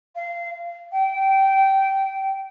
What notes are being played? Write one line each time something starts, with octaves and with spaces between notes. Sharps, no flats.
F5
G5